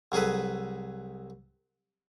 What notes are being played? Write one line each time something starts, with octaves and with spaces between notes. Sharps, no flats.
C2 F#3 G#4 A4 B4